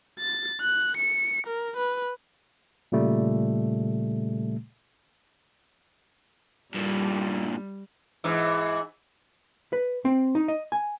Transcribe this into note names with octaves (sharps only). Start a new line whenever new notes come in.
A6
F#6
C#7
A#4
B4
A#2 C#3 G3 A3
G2 A#2 G3
G#2 E3
B4
C4
D#4
D#5
G#5